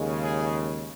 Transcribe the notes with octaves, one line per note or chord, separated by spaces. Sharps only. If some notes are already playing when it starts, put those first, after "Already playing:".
Already playing: D#2 C#3 G#3
G#4